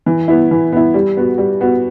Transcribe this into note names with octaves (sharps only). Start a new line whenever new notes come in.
E3
B3 E4
E3
B3 E4
G3
B3 F#4
G3
B3 F#4